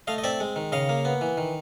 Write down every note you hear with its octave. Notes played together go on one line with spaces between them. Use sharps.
A3 D#5 F5
D#5
C4 D5 E5
G#3
D#3
C#3 D#5 F5
A#3
B3
E3
D#3